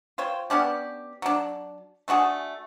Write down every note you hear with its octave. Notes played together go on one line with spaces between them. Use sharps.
F4 C5 C#5 G5
B3 C#4 D4 G4
F#3 D4
A3 D4 F#4 G#4